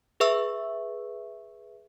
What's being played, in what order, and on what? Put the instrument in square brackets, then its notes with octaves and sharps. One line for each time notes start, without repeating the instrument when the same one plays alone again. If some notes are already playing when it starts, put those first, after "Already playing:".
[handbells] G#4 B4 E5 C#6 E6